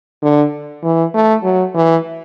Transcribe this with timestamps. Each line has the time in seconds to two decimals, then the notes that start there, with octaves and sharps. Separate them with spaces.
0.22 D3
0.83 E3
1.14 A3
1.44 F#3
1.75 E3